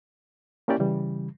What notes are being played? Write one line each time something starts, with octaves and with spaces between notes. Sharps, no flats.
A#3 C#4 E4 G4 D5
C#3 E3 G3